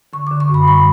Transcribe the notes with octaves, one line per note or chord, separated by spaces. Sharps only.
D3 C#6
D6
D3
C#6
F#2 B5
G3 B5